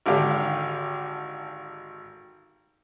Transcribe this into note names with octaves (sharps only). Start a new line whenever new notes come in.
G#1 D3 G4 F5